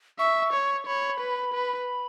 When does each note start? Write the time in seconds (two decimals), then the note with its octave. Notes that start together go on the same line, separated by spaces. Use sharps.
0.19 E5 C#6
0.53 C#5
0.87 C#5 B5
1.20 B4
1.54 B4